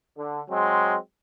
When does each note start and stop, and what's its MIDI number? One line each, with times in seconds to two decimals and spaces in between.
0.17 0.40 50
0.49 0.95 54
0.49 0.95 56
0.49 0.95 60